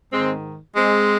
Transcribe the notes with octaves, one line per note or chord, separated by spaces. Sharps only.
G#2 D#3 G#3 C4
G#3 C4